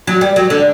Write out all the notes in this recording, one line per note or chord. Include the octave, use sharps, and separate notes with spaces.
F#3
G3
F#3
D3